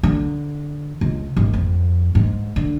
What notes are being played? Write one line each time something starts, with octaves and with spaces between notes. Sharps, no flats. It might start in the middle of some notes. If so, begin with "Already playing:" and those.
D3
C#2
G#1
F2
G#2
D3